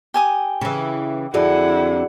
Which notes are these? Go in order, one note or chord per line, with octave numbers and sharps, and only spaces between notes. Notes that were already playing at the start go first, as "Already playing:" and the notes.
G4 G#5 D#6
C#3 E3
F2 D3 E4 F#4 G#4 D5 F#5